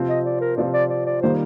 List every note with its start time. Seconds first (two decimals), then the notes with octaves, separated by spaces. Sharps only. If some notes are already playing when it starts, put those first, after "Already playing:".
Already playing: C3 F3 C4 F4
0.09 D#5
0.26 D5
0.41 A#4
0.57 C3 F3 C4 F4 D5
0.73 D5
0.90 D5
1.06 D5
1.22 D#3 G3 A#3 F4 C5